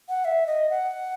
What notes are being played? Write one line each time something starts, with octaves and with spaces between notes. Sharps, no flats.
F#5
E5
D#5
F#5